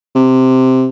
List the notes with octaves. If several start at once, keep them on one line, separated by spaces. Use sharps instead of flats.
C3